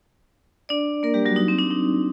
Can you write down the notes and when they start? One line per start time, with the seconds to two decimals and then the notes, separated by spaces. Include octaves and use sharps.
0.69 D4 D5
1.03 A#3 A#4
1.14 G3 G4
1.25 F#3 F#4
1.36 D#4
1.48 C4
1.59 D4
1.70 D#4